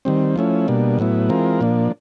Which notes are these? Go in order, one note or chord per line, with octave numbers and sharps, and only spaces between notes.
D#3 G3 C4
F3 A3 C#4 E4
B2 G3 A#3 D4
A2 F#3 B3 E4
E3 G#3 C4 F4 A#4
A#2 F3 A#3 D4